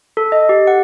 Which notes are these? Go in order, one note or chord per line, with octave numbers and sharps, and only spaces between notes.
A4
D#5
G4
F#5